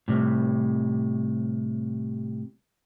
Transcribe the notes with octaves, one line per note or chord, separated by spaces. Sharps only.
A2 C3 G3